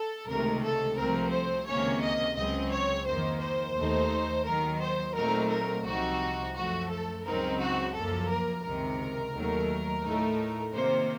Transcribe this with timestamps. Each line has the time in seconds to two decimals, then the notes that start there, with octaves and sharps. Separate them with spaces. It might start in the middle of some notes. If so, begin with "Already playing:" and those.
Already playing: A4
0.27 C#2 C3 D#3 A3 A#4
0.63 A4
0.96 C2 C3 F3 A3 C4 A#4
1.31 C5
1.66 C#2 C3 D#3 A#3 C#4 C#5
2.02 D#5
2.36 C#2 C#3 F#3 C4 D#5
2.72 C#5
3.05 F2 D#3 A#3 C5
3.40 C5
3.76 D#2 D#3 A3 D#4
4.46 D#2 D#3 F#3 A#4
4.81 C5
5.15 A#2 F#3 A3 C4 D#4 A#4
5.49 A#4
5.85 C2 C3 F3 C4 D#4 F#4
6.54 F#2 F3 A3 F#4
6.89 A4
7.24 C#2 C#3 F#3 C4 D#4 A#4
7.59 F#4
7.93 F#2 F3 A#3 A4
8.29 A#4
8.64 C#2 C3 D#3 A#4
9.34 D#2 D#3 F#3 A3
10.03 A2 A3 D#4
10.73 C3 D#3 A#3 C5